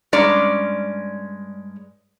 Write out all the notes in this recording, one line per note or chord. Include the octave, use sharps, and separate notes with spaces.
G2 G#3 C#4 D5 A#5